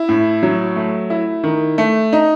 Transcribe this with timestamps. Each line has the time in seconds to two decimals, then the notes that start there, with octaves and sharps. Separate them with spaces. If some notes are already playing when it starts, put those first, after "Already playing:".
Already playing: E4
0.09 A2
0.43 F#3
0.76 A3
1.10 E4
1.44 D#3
1.78 A3
2.13 D#4